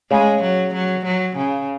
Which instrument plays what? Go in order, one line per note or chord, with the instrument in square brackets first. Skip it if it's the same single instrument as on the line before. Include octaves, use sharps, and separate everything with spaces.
[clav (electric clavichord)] C#3 [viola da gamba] G#3
[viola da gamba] F#3
F#3
F#3
C#3